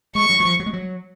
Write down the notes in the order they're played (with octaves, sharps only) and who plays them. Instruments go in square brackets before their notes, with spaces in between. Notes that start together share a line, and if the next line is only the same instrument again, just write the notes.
[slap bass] G#3 [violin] C#6
[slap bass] F#3
F#3
F3
F#3
G#3
F#3